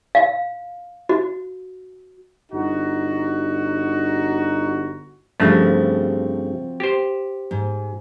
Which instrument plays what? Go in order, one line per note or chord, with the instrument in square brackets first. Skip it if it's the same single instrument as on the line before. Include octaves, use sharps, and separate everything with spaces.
[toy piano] F5
F#4
[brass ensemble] G1 D#4 F#4
[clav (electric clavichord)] G2 C#3 A3 [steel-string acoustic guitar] F3 C4 F#4
[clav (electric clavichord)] G4 C5
[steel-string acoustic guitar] G#2